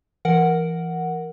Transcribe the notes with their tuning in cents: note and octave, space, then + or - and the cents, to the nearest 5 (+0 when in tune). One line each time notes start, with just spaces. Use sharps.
E3 +30 A#4 +0 F#5 +0